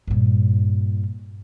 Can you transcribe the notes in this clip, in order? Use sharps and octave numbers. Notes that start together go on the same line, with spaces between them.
G2 A#2